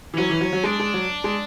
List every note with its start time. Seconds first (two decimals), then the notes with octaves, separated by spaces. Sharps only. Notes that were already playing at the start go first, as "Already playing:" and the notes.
0.14 E3
0.18 F#3 C#4
0.30 E3
0.41 F#3
0.53 F#3
0.64 G#3 D4
0.80 G#3
0.94 F#3
1.24 G#3